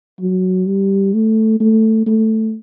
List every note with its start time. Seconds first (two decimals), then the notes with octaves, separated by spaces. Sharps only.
0.20 F#3
0.67 G3
1.14 A3
1.60 A3
2.07 A3